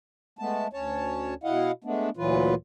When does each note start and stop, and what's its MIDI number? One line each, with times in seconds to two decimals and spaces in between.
0.39 0.67 56
0.39 0.67 57
0.39 0.67 59
0.39 0.67 81
0.73 1.34 38
0.73 1.34 61
0.73 1.34 73
0.73 1.34 81
1.43 1.72 47
1.43 1.72 64
1.43 1.72 75
1.43 1.72 77
1.43 1.72 78
1.84 2.10 56
1.84 2.10 57
1.84 2.10 59
1.84 2.10 62
2.17 2.55 38
2.17 2.55 46
2.17 2.55 52
2.17 2.55 54
2.17 2.55 65
2.17 2.55 71